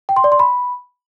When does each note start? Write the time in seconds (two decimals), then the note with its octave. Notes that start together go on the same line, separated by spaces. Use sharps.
0.09 G5
0.16 C6
0.24 D5
0.32 C6
0.39 B5